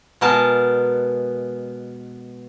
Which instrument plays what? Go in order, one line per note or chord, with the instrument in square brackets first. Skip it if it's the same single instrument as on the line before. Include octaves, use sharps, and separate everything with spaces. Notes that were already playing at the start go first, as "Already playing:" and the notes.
[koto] B2 G#3 B3 A#4 A5